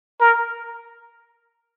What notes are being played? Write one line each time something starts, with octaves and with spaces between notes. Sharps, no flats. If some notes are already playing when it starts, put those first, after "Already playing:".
A#4